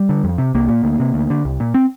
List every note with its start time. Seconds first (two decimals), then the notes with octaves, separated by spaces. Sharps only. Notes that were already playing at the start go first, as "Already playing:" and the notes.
Already playing: G3
0.09 D3
0.24 F2
0.38 C3
0.54 C2 A#3
0.69 A#2
0.84 D2
1.00 C3
1.14 D2
1.30 D3
1.45 C2
1.60 A#2
1.74 C4